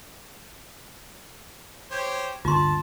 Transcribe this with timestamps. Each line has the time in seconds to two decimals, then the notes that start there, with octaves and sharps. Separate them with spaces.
1.91 G4 C5 C#5
2.45 G1 D2 F4 A5 C6